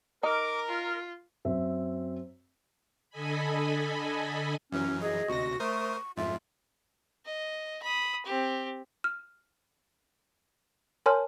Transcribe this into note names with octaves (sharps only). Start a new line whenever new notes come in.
D#4 A#4 D6
F4
F#2 C4 E5
D3 A4 D#5 G#5 B5
F#2 E3 F#3 C#4
G#4 D#5
D2 C3 F#4 A#6
A3 A#4 C5 C#6 D#6
F2 G#2 F4 E5
D#5
B5 D#6
C4 G4
F6
A#4 C#5 G#5 A5 C6 F6